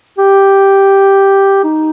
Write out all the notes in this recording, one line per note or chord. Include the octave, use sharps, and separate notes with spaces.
G4
D#4